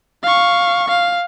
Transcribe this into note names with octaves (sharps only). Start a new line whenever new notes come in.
F5 C#6
F5